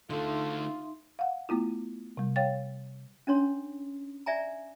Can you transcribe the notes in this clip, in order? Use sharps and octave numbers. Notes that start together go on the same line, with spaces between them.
D3 A3 D#4 F4 A4 E5 C6
F5 F#5
A3 B3 E4 F4
C3 G3
C#5 F5 G5 A6
C#4 D4 C#5 C6
D5 E5 G#5 A#5